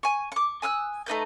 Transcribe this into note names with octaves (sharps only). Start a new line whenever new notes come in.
G#5 C#6
C#6 D6
G#5 D#6 E6 F#6
A3 D#4 B4 G6